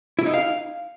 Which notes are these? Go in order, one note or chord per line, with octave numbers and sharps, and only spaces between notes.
E4
D#4
F5